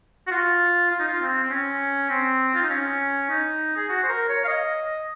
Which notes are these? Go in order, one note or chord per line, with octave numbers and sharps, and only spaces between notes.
F#4
F4
F4
D#4
F4
C4
C4
C#4
C4
F4
D#4
C#4
D#4
G#4
F#4
C5
A#4
C#5
F5
D#5